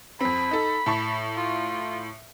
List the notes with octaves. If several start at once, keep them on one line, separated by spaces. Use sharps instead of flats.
F2 C4 B5
D#4 A4
A2 A5 C#6
F4